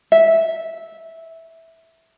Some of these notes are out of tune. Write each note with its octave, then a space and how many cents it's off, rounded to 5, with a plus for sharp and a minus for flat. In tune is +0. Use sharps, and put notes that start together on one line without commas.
E5 -10